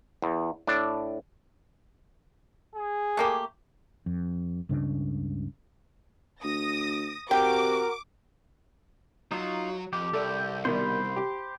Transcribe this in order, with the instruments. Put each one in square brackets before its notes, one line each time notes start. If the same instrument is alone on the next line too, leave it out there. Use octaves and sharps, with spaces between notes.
[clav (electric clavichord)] E2
A2 D4
[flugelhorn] G#4
[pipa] A3 A#3 G4
[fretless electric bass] F2
C#2 G2 C#3 D4
[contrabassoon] D2 [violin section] D#6 A#6
[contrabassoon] C3 [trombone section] F#4 A#4 [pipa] G5 [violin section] D6
[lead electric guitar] F#3 [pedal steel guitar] D#4 F4
[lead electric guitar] F2 [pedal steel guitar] G4
[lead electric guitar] C2 [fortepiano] A4 D5
[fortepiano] B2 D#3 G3 [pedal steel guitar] C5 B5
[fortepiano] G4